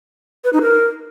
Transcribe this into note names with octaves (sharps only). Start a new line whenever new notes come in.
B4
D#4
A#4